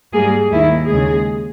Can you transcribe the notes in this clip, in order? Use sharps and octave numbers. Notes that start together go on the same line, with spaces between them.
G#2 G3 A#3 G#4
D#2 D#3 A#3 E4
D#2 C#3 G#3 G#4